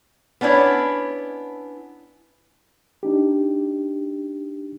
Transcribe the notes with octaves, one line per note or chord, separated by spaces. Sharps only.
B3 C#4 D4 E4 C#5
D4 D#4 G4